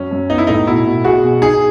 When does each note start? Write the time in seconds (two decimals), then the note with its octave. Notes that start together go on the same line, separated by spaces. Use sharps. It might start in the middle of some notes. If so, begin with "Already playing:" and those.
Already playing: F#2 C#4
0.11 F#2
0.30 B3 D#4
0.38 E4
0.47 A2 D#4
0.67 B2 E4
0.86 B2
1.05 F#4 G#4
1.23 B2
1.42 D#4 G#4